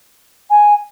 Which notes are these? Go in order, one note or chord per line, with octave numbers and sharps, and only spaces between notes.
G#5